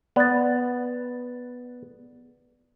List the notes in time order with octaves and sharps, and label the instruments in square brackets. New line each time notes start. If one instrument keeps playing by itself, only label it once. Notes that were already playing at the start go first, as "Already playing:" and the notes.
[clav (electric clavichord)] B3 [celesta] D5 A6